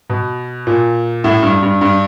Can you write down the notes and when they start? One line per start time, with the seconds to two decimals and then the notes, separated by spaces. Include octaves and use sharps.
0.10 B2
0.67 A#2
1.24 A2
1.42 G2
1.62 G2
1.81 G2